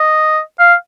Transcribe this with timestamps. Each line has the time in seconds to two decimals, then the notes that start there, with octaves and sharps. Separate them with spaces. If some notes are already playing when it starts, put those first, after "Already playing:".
Already playing: D#5
0.59 F5